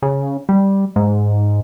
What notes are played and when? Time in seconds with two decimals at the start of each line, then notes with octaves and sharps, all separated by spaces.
0.02 C#3
0.49 G3
0.96 G#2